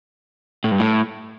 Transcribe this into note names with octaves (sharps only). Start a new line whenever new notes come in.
A2
G2
A2